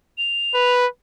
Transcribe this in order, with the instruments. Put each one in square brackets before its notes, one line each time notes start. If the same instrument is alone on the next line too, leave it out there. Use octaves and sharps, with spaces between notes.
[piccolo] F7
[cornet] B4